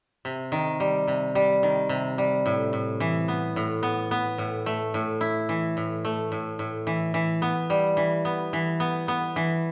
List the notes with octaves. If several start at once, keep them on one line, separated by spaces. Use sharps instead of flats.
C3
D#3
G3
C3
G3
D#3
C3
G3
A2
A2
E3
B3
A2
B3
B3
A2
A3
A2
E4
E3
A2
A3
A2
A2
E3
E3
B3
G3
E3
B3
E3
B3
B3
E3